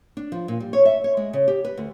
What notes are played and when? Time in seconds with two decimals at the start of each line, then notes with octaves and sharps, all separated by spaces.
0.17 D4
0.32 F3
0.48 A#2
0.60 G3
0.73 C#5
0.85 E5
1.04 C#5
1.17 G#3
1.33 C#3
1.48 G4
1.65 B4
1.77 D2